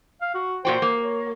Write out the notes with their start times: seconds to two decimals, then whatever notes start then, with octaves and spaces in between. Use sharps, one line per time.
0.22 F5
0.35 F#4
0.65 A#2 F#4 C5 G5
0.82 A#3
1.03 C#5